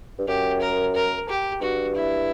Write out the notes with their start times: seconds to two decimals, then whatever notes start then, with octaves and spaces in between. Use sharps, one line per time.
0.18 G2
0.28 F#2 G4
0.61 A#4
0.95 A#4
1.29 G4
1.61 G2 F#4
1.95 E4